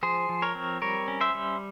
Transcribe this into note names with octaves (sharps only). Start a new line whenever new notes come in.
F3 G#4 C5
F3
A#4 C#5
C4
G3 A#4 C#5
C#4
C5 E5
G3